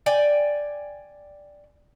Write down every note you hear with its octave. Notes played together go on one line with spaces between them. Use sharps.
D5 G5 G#5